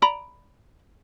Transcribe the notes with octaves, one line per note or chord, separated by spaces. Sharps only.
D5 A#5 B5